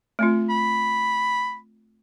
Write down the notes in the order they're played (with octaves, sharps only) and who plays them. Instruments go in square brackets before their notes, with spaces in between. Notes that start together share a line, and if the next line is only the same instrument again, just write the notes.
[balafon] A3 C4 F4
[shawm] B5